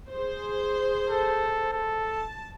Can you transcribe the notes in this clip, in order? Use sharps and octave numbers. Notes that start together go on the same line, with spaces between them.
G#4 C5
A4
A4
A5